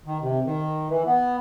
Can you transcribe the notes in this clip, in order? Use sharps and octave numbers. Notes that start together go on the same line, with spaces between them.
D#3
C3
D#3
E3
B3